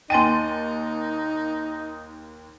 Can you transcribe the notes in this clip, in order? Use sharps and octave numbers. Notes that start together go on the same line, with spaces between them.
D#2 D#4 G5 G#5 C6 A6 D#7